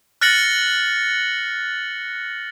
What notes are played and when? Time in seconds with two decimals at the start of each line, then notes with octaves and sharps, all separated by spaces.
0.21 F6 F#6 A6 A#6 C#7 F#7